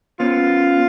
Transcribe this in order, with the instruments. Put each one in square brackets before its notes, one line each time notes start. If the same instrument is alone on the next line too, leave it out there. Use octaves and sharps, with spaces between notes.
[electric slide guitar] B3 C#4 [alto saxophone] F4